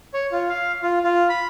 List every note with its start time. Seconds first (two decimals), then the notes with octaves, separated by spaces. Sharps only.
0.14 C#5
0.32 F4
0.49 F5
0.83 F4
1.03 F4
1.29 B5